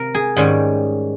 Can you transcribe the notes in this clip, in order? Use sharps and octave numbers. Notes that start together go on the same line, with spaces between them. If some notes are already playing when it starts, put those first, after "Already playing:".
Already playing: C3 A#4
G#4
G#2 D#3 G3 C#4